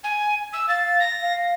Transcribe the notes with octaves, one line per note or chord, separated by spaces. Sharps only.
G#5
E6
F5 A6
A#6
F5